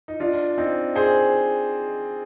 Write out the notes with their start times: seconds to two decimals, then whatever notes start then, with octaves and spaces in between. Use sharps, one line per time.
0.08 D#4
0.20 D4 F4
0.58 C4 D#4
0.96 G#4 C5